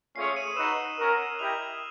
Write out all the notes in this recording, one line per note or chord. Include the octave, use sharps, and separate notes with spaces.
A3 C#4 F4 G#4 C#5 C7
D#6 D#7
D#4 F#4 B4 E6 E7
C#4 F#4 A#4
E4 G4 A#4 D#5 G5 F6 F7